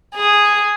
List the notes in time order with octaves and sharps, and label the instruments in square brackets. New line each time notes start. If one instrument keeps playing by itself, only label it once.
[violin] G#4